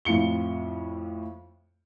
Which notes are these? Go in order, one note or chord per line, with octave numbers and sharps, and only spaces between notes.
F2 A2 F4 C#7 G7